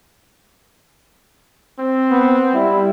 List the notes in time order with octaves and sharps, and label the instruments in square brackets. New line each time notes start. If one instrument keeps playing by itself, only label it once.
[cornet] C4
[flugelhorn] B3
[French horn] G3 [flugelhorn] E4